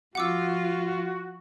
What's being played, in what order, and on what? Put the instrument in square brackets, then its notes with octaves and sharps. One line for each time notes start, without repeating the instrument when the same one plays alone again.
[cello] F3 F4 [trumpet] F#4 [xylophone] F#5 D6 E6